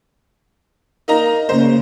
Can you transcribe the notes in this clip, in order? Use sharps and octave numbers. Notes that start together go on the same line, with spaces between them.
A#3 D#4 A#5
C#3 A#3 C5